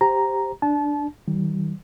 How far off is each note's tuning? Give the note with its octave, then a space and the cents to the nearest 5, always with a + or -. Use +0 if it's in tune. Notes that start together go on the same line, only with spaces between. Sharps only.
G4 +0 C5 +0 A#5 +0
D4 +0 A5 -30
D#3 +20 G3 -40